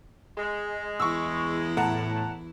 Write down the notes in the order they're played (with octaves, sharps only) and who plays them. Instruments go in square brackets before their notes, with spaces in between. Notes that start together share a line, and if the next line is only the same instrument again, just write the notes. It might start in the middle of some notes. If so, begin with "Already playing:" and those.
[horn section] G#3
[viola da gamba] E2 E4 [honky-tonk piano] C#6 E6
[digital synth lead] A2 [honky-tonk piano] F#5 A5 A#5